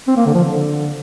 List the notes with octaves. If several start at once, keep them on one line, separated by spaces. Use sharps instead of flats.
C4
A#3
D3
F3
D3